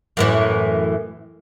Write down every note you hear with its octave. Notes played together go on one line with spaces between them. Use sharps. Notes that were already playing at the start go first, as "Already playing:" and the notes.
F#2 A2 E3